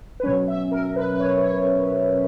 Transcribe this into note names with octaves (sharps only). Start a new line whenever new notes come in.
B4
B2 F#3 C#4 C#5
E5
A#4
B4
B4
C#5
C#5